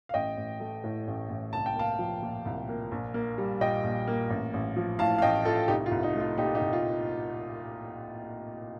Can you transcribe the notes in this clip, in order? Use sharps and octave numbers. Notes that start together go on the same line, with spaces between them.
F5
A1 D#5 G5
A1
A3
A2
A1
A1
C2 A5
G5
A#3 F5 A5
F3
A#2
C2
A#3
A#1
A#3
G3
A#2 D#5 G5
A#1
A#3
A1
A1
F3
A2 F5 A5
F5
A1 D#5 G5
A1 F4 A4
C2 D#4 G4
F4
C2
D#4
A3
F4
A#2 D#4 G4
D#4 G4
C2
F4